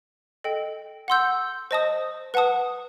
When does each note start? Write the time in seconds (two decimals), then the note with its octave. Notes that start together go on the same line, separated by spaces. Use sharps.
0.44 A4 D#5 G5
1.08 F#5 C6 E6 G6
1.71 C5 D#5 A5 D#6
2.34 B4 F#5 A5 D#6